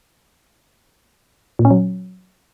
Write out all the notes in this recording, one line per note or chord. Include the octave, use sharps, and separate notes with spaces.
A#2
C#4
F#3